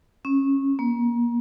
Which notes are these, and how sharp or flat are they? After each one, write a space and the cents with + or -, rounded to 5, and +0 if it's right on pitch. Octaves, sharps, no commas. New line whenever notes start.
C#4 -20
A#3 +30